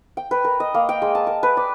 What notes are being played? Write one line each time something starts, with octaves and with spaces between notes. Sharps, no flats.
G5
B4
A#4
D#5
A#3
G5
G#3
A5
A#4
B4
D5